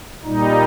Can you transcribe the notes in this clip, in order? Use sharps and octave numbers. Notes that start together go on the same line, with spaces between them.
A#2 G3 D#4